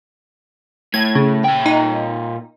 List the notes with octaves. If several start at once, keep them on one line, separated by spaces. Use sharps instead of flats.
A2 G#6
C#3
A#2 G5
D#4